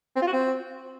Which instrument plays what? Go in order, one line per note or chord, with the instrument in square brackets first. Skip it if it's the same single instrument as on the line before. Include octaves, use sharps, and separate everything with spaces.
[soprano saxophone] C4
F4
F#4
C4